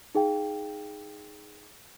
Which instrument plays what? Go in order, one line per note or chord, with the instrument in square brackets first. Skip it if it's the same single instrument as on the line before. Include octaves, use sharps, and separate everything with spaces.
[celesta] D#4 G#4 F5 G5